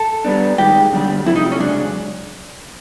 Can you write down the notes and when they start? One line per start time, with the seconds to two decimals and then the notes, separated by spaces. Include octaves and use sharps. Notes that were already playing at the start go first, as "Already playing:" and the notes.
Already playing: A4
0.25 G3 B3 D4
0.58 G2 D#3 G#3 G4
0.93 F#2 D3 G3
1.26 C3 F3 A3 E4
1.36 D#4
1.52 C#4
1.60 F#2 C#3 G#3 D4